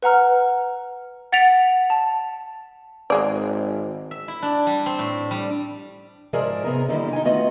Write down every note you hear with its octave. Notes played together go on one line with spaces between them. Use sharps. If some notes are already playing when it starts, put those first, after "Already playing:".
B4 F#5 A#5 F6
F#5 A6 B6 D7 F7
A5
G#1 G#3 G#4 D5
E5
E4
D4
G3
C4
A2
G3
G#2 F3 G#4 A#4 D5 E5
C3 B3 G#4 A#4
D3 D#3 G3 A#3 E4
D#4 G#5
A3 B3 F4 F#4 D#5 F#5